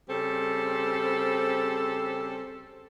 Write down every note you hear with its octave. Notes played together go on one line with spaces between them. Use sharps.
C#3 G3 C4 A4 C5